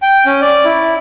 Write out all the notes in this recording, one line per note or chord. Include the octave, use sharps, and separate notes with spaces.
G5
C#4
D5
E4